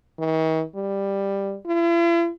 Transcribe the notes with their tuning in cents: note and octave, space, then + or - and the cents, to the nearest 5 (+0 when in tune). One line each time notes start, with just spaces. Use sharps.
D#3 +45
G3 +10
E4 +45